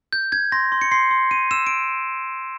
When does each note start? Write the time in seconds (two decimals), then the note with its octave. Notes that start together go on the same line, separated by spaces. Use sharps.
0.13 G6
0.32 G6 G#6
0.52 C6 A#6
0.72 C6
0.81 C#7
0.91 C6 C7
1.11 C6
1.31 C6 D#7
1.51 E6 E7
1.67 D7